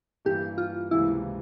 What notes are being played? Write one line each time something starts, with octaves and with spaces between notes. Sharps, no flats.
G2 E3 A#3 G4
F4
C#2 C3 E3 A#3 E4 F4